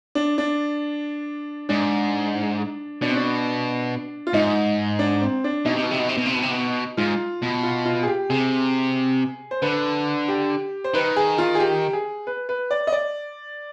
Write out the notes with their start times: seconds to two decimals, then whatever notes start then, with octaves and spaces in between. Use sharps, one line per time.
0.15 D4
0.38 D4
1.69 G#2 D4
3.02 B2 D4
3.09 C4
3.16 D4
4.27 F4
4.33 G#2 D#4
4.99 D4
5.21 C4
5.44 D4
5.65 B2 D#4
5.75 C3
5.83 B2
5.91 C3
6.00 B2
6.09 C3
6.18 B2
6.26 C3
6.35 B2
6.43 C3
6.52 B2
6.97 G#2 F4
7.42 B2
7.63 F4
7.85 F4
8.03 G#4
8.07 G4
8.30 C3 G#4
9.51 C5
9.62 D3 B4
10.28 G4
10.84 C5
10.94 D#3 B4
11.16 G#4
11.38 F4
11.55 G#4
11.60 G4
11.93 G#4
12.27 B4
12.49 B4
12.71 D5
12.87 D#5
12.92 D5